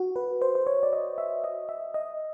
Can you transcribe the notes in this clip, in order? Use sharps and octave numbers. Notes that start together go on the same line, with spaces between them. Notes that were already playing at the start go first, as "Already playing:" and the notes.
Already playing: F#4
B4
C5
C5
C#5
D5
D#5
E5
D#5
E5
D#5